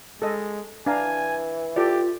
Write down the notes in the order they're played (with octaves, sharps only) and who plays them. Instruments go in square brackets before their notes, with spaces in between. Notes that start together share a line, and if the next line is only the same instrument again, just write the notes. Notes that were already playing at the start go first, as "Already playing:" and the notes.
[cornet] G#3 [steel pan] A4 D#5
[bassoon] E3 [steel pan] D4 F5 A#5 [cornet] G#5
[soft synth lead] F4 [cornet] G4 [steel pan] A4 D5